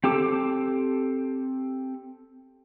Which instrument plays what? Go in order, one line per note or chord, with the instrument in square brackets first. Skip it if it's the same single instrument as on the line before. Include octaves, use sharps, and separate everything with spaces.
[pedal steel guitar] C4 G4 A4 D6